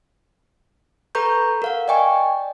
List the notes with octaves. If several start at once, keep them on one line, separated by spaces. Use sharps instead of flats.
A4 B4 A#5 C#6 G6
A#4 F5 F#5
D5 D#5 G5 G#5 C#6